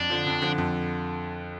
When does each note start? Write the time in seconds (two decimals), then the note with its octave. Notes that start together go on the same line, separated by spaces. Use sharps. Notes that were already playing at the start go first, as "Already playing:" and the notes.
Already playing: F2 D4
0.10 D3 F3
0.26 F2
0.42 D3 F3
0.58 F2